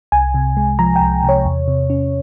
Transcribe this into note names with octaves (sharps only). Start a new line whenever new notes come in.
C2 G#5
C3
G#3
F3 A#5
G5
C2
C3
C#5
E2
C3
C#4